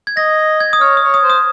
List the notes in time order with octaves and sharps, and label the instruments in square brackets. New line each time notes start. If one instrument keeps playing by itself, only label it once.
[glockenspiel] G#6
[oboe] D#5 [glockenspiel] A#6
[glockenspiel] G#6
D#6
[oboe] C#5 [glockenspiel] F6
[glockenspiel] D#6
[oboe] C#5
[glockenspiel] D#6
[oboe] C5
[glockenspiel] D#6